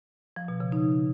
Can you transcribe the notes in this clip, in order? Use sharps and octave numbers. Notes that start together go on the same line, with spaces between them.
F3
B2
C#3
D#4